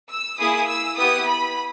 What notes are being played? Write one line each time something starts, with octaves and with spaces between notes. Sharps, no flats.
E6
A#3 E4 G#4 D#6
E6
B3 E4 G4 D#6
B5